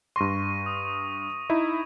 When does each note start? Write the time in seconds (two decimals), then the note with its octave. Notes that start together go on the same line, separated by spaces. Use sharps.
0.16 G2 C6 C#6 A#6 D#7
0.66 D#6
1.50 D#4 E4